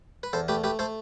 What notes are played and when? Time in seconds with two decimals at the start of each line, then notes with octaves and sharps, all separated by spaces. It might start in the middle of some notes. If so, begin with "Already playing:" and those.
0.23 B4
0.33 E2 A4 C5
0.48 A3 G4 B4
0.64 A3 G4 B4
0.79 A3 A4 C5